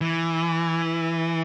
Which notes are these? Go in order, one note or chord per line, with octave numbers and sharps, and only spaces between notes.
E3